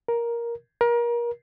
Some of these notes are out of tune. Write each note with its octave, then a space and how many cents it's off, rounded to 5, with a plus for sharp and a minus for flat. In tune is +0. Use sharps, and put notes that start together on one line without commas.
A#4 +10
A#4 +30